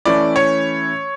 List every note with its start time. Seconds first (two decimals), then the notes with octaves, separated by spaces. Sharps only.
0.05 E3 A3 C#4 E4 D5
0.36 C#5